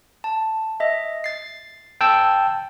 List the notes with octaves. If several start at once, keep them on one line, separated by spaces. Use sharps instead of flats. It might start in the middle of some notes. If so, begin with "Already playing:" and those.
A5
D#5 E5
A6 C7
G5 A5 E6